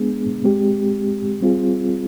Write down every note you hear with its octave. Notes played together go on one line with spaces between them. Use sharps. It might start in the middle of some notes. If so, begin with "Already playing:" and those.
Already playing: G#3 B3 D4 G#4
G#3 C4 G4
G3 C4 F4 G#4